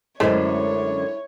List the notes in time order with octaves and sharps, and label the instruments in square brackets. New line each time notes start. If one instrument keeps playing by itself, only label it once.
[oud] F#2 D3 G#3 [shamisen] A3 [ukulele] E4 C5 [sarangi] C#5